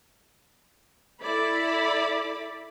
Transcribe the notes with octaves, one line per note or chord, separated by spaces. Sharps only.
E4 A4 D5 B5